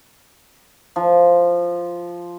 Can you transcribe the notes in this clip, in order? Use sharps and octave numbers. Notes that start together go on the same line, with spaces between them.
F3